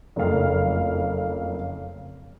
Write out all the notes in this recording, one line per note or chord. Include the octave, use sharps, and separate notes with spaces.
F#1 F2 A3 F5 F6